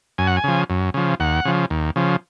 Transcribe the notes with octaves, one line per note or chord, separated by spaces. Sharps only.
F#2 G#5
F#5
G#5
C#3 F3
F#2
C#3 F3
D#2 F#5
C#3 F3
D#2
C#3 F3